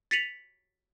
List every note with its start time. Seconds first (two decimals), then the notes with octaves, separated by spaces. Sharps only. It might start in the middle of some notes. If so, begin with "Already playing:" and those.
0.11 A6 B6 C#7 D#7 F7 F#7